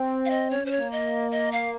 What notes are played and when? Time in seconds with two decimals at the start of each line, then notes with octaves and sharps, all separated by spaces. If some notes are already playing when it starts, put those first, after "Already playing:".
Already playing: C4
0.25 F5
0.30 D#5
0.51 C#4 C#5
0.64 C#4 C5
0.71 C#5
0.78 A#3
0.92 D#5
1.31 D#5
1.52 F5